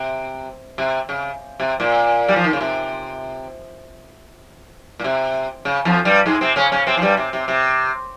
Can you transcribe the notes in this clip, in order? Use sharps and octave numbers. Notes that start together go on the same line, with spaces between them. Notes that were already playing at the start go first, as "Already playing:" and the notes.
Already playing: C3
C3
C#3
C3
A#2
G3
F3
D#3
C#3
C3
A#2
C3
C#3
F2 F3
G2 G3
G#2 G#3
C3 C4
C#3 C#4
C#3 C#4
C3 C4
F3
G2 G3
C3
C3
C3